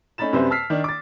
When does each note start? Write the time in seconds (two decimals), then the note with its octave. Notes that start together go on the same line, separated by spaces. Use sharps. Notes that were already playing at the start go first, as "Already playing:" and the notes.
0.18 A3 C#4 D#4 B5 A6 E7
0.33 F#2 C3 G3 B4 C5 E5
0.50 A5 E6 F6 B6 C7
0.70 D#3 D4
0.84 D6 A6